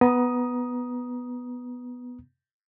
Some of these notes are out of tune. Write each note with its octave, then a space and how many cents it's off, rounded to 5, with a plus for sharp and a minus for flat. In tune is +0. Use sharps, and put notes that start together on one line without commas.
B3 +0 A#5 +25 D#6 +0